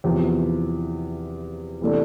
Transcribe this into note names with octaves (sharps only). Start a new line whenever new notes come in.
E2 C3 F3
C3 E3 A3 D4